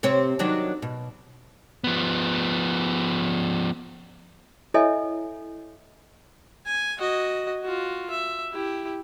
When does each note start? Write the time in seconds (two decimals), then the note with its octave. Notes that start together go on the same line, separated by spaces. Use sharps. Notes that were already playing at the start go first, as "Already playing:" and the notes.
0.03 C3 C4 C#5
0.39 D#3 F#3 D4
0.82 B2
1.84 F3 B3
4.74 E4 A4 C#5 D#5 E5 G#5
6.66 G#5
6.98 F#4 D#5
7.63 F4 F#4
8.10 E5
8.53 E4 G4